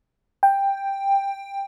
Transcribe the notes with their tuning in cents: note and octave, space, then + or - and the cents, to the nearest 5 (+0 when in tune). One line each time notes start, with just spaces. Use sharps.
G5 +10